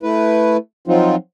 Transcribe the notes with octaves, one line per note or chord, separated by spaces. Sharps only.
A3 E4 B4
F3 F#3 C4 D#4 F4